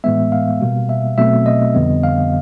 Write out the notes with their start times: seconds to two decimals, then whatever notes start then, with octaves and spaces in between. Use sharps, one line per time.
0.04 A2 E3 G#3 B3 E5
0.32 F5
0.61 B2 G3 A#3
0.89 E5
1.17 B2 F#3 A3 C4 E5
1.46 D#5
1.75 F2 D3 G3 B3
2.03 F5